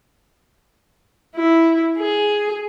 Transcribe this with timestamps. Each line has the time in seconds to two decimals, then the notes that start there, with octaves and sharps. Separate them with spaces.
1.36 E4
1.98 G#4